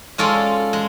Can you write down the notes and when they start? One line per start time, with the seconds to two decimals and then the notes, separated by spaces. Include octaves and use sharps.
0.18 G#3 C#4 F4 A4 D5
0.73 G#3